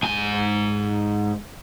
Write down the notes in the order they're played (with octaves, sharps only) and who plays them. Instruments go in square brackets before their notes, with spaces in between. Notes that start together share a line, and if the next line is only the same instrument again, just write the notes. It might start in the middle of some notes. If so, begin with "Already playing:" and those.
[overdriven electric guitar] G#2 G#5